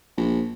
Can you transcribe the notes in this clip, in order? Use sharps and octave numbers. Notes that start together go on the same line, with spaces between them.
A#1